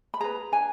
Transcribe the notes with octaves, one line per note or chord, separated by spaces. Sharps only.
B5
G#4 B4 A#5
D4 G#5